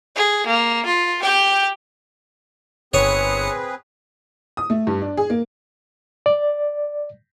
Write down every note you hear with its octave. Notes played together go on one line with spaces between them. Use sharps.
G#4
A#3
F4
G4 G5
G1 C4 G#4 B4 C#5 D#6 C#7
D#6
A3
G2
D4
G#4
A#3
D5